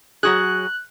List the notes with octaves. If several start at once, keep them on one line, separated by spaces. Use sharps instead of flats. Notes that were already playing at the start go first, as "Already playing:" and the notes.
F#3 F#4 G#4 F#6